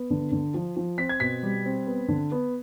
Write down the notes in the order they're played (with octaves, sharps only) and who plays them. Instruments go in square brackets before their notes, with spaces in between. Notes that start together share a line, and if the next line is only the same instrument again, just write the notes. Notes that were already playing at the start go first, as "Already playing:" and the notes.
Already playing: [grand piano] B3
D3
D3
F3
F3
C4 B6
G#6
B2 B6
G3
C4
B3
D3
B3